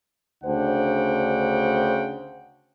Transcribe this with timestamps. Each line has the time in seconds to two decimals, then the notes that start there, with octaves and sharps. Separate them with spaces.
0.44 D2 C#3 D4 C5 F#5 G5